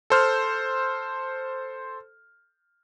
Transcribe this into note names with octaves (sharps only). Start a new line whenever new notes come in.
A4 C5 F6